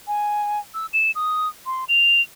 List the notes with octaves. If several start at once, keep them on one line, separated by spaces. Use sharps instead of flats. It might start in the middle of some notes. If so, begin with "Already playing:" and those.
G#5
E6
E7
D#6
C6
F7